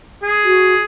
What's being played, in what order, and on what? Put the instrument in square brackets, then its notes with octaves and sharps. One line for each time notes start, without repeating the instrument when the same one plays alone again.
[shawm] G#4
[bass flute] F#4